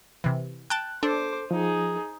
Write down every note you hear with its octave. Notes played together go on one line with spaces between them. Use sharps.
C3 E3
G5 A5 F#6
D4 A4 C5 D6
F3 D#4 G#4